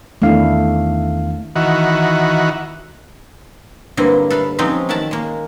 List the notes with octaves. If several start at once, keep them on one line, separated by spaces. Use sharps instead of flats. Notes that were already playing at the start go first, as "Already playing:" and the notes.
E2 D#3 A3 D4 E4 F5
D#3 E3 F#4
G2 D3 F#3 A#3 C4 E4
A4 B4 E5 F5
F3 F#3 G#3 C4 C#4 D#4
D#3 C#4 E5 F#5 A5 A#5
G#3 A#3